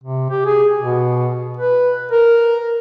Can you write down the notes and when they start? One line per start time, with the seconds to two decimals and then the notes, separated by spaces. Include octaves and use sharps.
0.04 C3
0.30 G4
0.46 G#4
0.81 B2
1.57 B4
2.12 A#4